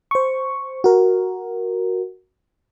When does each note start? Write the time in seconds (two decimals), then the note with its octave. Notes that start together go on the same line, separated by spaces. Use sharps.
0.11 C5 C#6
0.84 F#4 A#4